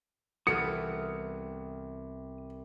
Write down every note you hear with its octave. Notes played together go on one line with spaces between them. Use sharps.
C2 E3 B3 A4 D#6 F6 C#7